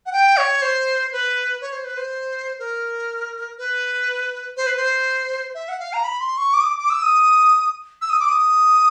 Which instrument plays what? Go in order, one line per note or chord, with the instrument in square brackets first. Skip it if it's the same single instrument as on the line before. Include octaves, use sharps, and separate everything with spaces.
[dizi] F#5
G5
C#5
C5
B4
C#5
C5
B4
C5
A#4
B4
C5
B4
C5
E5
F#5
F5
A#5
B5
C6
C#6
D6
D#6
D6
D6
E6
D#6
E6
D#6
D6
D#6